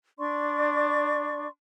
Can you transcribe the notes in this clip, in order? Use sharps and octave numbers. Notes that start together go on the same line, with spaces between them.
D4 D5 C6 C#6